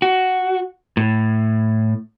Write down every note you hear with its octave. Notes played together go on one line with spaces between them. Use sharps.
F#4
A2